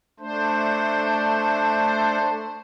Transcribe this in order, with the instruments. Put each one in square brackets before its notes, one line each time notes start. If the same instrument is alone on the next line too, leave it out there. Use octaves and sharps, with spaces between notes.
[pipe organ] A3 D4 C5